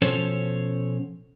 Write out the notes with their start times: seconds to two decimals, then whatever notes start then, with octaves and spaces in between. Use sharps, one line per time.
0.02 B2 F3 C#4 A4 C5 C#5